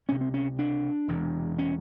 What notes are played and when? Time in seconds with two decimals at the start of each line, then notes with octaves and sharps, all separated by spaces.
0.08 C#2 C3 C#4
0.21 C4
0.34 C#4
0.59 D4
1.08 E1 E2 C3
1.58 C#4